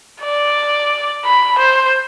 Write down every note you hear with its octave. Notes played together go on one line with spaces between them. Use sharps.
D5
B5
C5